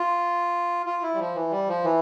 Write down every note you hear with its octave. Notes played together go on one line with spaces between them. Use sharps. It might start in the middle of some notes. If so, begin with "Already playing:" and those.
Already playing: F4
F4
E4
G3
F3
E3
G3
F3
E3